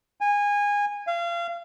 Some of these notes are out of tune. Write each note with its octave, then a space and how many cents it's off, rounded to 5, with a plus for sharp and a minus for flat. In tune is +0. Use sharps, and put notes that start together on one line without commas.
G#5 -20
F5 -30